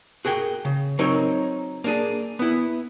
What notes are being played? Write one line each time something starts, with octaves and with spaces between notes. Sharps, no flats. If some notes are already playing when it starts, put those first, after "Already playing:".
F#4 G#4 A#4 G5
C#3
F#3 C4 D#4 A#4 C#5
A#3 D4 G#4
B3 E4